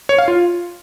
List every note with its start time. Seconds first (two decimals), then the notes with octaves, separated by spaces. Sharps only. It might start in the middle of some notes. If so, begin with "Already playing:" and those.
0.09 C#5
0.18 F5
0.28 F4